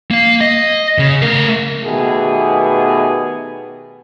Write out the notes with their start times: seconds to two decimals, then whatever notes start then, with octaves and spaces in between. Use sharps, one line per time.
0.11 A#3 F5
0.41 D#5
0.98 C#3
1.22 A3 A#4
1.84 B2 D#3 A3 B3 G4 G#4